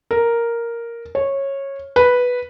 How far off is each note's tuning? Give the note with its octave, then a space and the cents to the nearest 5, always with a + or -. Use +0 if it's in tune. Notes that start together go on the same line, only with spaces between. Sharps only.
A#4 +0
C#5 -15
B4 -5